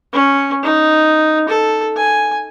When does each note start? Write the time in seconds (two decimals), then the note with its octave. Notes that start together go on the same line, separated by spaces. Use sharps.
0.13 C#4
0.63 D#4
1.49 A4
1.97 G#5